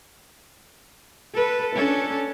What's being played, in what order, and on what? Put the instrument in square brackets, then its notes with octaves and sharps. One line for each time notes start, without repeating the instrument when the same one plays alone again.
[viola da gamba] A4 B4
C#4 D4 A4